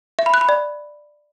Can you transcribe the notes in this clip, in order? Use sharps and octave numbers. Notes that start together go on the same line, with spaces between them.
E5
B5
F#6
B5
D5